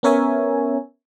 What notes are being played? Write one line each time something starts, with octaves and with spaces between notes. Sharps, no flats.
B3 C#4 A#4 C#5 E5 G#5